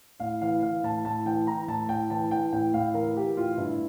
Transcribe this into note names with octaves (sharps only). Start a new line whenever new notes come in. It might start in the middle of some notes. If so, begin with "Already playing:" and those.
A2 F5
E3 F5
E3 F5
A2 A5
A2 A5
E3 G5
E3 A#5
A2 A5
A2 G5
E3 A5
E3 G5
A2 G5
A2 F5
E3 A#4
E3 G4
A2 F4
G2 E4